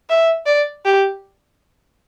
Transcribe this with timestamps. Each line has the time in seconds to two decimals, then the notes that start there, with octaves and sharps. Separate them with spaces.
0.09 E5
0.46 D5
0.85 G4